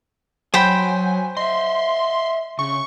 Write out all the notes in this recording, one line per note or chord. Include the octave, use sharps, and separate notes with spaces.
F#3 C5 G5 G#5 B5
D#5 E5 C6
C#3 C#6